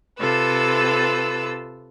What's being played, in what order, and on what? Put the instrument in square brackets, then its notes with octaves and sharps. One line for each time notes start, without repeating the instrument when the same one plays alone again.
[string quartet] C3 F4 A4 B4 E6